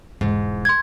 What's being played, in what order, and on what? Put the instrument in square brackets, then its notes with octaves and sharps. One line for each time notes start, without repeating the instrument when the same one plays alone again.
[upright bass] E1 [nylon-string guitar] G#2
[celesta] C6 G#6